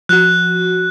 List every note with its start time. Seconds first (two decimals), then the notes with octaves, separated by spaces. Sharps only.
0.09 F3 F#4 F#6